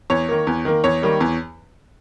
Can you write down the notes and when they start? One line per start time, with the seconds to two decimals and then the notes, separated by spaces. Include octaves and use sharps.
0.10 E2 C#5
0.29 D#3 A#3
0.47 E2
0.65 D#3 A#3
0.84 E2 C#5
1.02 D#3 G3 A#3
1.21 E2